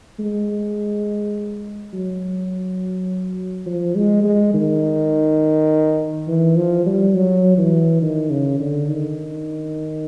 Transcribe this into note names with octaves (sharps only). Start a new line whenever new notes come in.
G#3
F#3
F3
G#3
G#3
D#3
E3
F3
G3
F#3
E3
D#3
C#3
D3
D#3